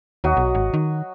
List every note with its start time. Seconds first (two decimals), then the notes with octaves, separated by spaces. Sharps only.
0.24 D#2 F#3 F#4 D#5
0.37 B1
0.55 G#1
0.74 D#3